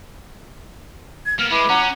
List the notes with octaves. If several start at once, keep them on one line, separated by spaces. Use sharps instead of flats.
G#6
A#3 B3 F6
G#3 E4 B4 D6
C#4 F#5 A#5